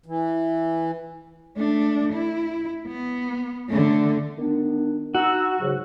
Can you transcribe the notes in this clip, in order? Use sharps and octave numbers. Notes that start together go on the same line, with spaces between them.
E3
A3 D4
E4
B3
D3 A3
D#3 B3 D4
D#4 F#4 F#5 E6
G#2 C#3 F#3